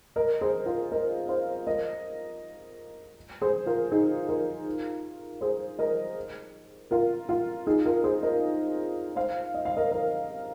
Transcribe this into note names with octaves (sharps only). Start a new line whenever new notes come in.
A#4 D#5
G#4 C5
F4 A#4
A#4 D#5
C5 F5
A#4 D#5
G#4 C5
F4 A#4
D#4 G#4
F4 A#4
G#4 C5
A#4 D#5
F4 A#4
F4
D#4 G#4
F4 A#4
G#4 C5
A#4 D#5
C5 F5
D#5
F5
A#4 D#5
A#4 D#5